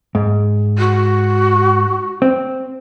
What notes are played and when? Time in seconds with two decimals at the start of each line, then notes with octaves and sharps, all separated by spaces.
0.15 G#2
0.78 F#4
2.22 C4